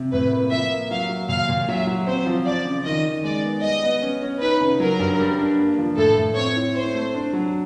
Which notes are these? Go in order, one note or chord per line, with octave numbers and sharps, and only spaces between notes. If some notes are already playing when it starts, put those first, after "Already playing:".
Already playing: C3
A2 B4
A#3
F3 E5
A#3
F#3 F5
F#3
A#2 F5
A#2
F#3 E5
F#3
C4 C5
F3
F3 D5
C#3
D#3 D#5
D#3
G#3 D5
B3
G3 D#5
B3
C#4
C#4
D#4 B4
C#3
F#3 A#4
G2
G3
D4
A#3
F3
A2 A4
A2
C4 C#5
E4
C4 C5
A3
D4
F#3